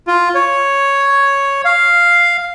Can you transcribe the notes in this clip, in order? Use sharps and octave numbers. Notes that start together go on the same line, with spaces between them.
F4
C#5
F5